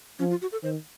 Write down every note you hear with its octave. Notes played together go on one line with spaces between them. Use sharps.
F3 C#4
F4
F#4
A4
D#3 C5